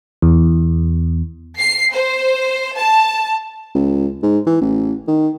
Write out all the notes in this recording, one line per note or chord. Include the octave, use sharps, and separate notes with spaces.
E2
C7
C5
A5
C#2
G#2
E3
A1
D#3